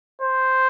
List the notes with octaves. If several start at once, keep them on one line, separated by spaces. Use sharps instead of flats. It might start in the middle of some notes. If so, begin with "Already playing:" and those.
C5